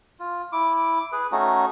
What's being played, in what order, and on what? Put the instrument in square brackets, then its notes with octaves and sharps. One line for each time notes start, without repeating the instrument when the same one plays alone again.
[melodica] F4
E4 D6
G#4 B4
A3 C#4 D#4 F#4